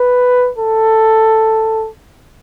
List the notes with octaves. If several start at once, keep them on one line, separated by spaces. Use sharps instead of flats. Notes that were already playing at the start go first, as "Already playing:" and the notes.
Already playing: B4
A4